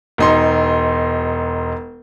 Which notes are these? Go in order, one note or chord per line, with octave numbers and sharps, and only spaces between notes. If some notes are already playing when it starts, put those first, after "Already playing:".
E1 D#4 C6